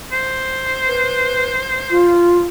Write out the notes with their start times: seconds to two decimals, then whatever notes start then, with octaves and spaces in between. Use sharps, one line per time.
0.12 C5
0.87 B4
1.90 F4